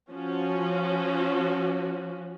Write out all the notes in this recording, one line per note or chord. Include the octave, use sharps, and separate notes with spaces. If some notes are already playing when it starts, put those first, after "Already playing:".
F3 C#4 F#4